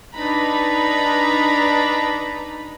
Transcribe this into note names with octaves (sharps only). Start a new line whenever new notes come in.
D4 D#4 B4 A#5 B5